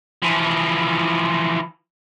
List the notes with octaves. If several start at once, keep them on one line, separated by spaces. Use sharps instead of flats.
E3 F3